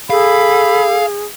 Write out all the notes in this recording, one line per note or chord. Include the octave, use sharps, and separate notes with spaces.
G#4 A4 F5 B5